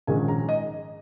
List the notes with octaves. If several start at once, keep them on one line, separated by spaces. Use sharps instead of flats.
A#1 G#2 D#3 G#3 C#4 G#5
A#5
D#5